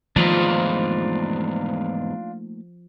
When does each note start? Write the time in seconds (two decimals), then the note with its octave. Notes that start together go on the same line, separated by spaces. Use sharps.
0.16 E2 G#2 D#3 F3 A3 A#3 D4 F4